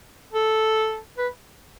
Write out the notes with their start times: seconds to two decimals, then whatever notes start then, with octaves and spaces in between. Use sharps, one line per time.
0.33 A4
1.18 B4